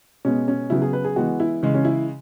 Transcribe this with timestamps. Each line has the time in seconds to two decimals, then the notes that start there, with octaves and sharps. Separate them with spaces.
0.25 B2 G#3 B3 C#4
0.48 C#4
0.70 C#3 F#3 B3 E4
0.82 G#4
0.93 B4
1.04 G#4
1.16 E3 G#3 B3 F#4
1.40 E4
1.62 C#3 E3 G#3
1.74 C#4
1.85 E4